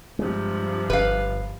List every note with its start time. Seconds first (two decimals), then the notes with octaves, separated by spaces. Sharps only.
0.19 G2 C3 F3 G#3
0.90 G1 B4 F5